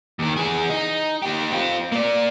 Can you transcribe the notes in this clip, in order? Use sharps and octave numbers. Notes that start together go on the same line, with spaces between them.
D#2 D#3
E3 G#4
D#4
D#4 G4
C4 F4
A#3 D5